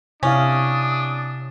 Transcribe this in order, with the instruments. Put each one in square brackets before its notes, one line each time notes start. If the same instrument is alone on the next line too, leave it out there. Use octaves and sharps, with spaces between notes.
[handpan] C3 E4 F5 [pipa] C#4 [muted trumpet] D4 [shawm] D#6